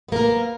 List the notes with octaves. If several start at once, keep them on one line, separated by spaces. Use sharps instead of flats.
A#3 B3 A#4